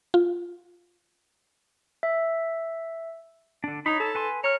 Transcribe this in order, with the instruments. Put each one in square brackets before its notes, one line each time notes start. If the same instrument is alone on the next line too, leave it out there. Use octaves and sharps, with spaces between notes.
[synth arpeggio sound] F4
[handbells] E5
[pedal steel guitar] D3 D4
[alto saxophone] D#4 [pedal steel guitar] C#5 A#5 B5
[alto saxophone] A4
[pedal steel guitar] B4 G#5 C6
[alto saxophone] C#5 [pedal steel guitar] A#5 F6